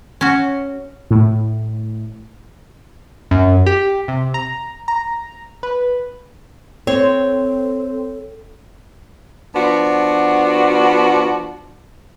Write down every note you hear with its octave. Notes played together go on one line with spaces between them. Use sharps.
C#4 F#4
A2
F#2
G4
C3
A#5
A#5
B4
C4 A4 C#5
F3 B3 D4 F#4